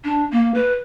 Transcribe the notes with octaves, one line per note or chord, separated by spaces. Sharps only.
D4
A#3
B4